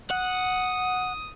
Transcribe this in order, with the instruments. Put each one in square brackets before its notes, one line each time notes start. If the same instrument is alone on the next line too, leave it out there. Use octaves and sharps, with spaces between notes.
[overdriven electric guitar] F#5 [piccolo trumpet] D#6